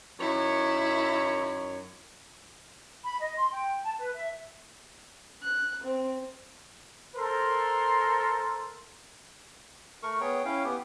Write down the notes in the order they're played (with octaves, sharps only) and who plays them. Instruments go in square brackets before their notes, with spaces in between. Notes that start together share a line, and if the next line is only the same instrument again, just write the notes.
[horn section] F#2 D#3 C#5 [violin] E4
[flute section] B5
D#5
C6
G5
A5
B4
E5
[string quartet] F#6
C4
[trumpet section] A4 A#4 C5 C6
[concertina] A3 A#4 C#6
B3 G#4 C#5 G5
C#4 E4 F5 G5
B3 G4